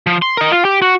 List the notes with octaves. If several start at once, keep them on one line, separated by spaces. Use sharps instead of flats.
F3
C6
A#4 D#5
F4
G4
F#4